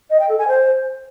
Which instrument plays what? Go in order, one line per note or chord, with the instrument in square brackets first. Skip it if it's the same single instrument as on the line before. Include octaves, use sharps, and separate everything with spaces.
[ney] D#5
G5
A4
G#5
C5